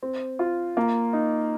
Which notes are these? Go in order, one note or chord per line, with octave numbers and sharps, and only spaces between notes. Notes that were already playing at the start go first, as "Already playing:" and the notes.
C4
F4
A#3
D#4